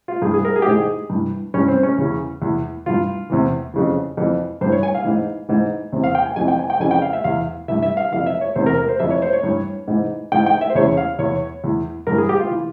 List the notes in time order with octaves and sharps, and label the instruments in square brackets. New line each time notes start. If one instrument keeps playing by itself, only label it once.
[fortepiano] F4
G2 E3 G#4
G#4
A#4
G#4
G4
G#2 E3 G#4
G2 E3
G2 E3 C#4
C4
C#4
E2 C#3 E3
E2 E3
G2 E3 F4
E2 C3 E3
F2 C#3 E3
F2 E3
G2 C5
E3
C#5
G#5
F5
G#2 E3
G#2 E3
E2 C3 E3
F5
G5
G#5
F2 C3 E3 G#5
G5
G#5
G5
F2 C#3 E3 G#5
G5
F5
E5
E2 E3 F5
G2 E3 E5
E5
F5
F2 E3 F5
E5
C#5
E2 C3 E3 C5
A#4
A#4
C5
F2 E3 E5
C#5
C5
C#5
G2 E3
G#2 E3
G#2 E3 G5
G5
E5
C5
E2 C#3 E3 C#5
F5
E2 E3 C#5
E2 E3
G2 E3 A#4
G#4
G4
F4
E3